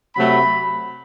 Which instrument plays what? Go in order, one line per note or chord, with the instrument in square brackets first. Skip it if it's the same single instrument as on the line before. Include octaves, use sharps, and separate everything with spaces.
[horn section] C3 F#3 A3 B5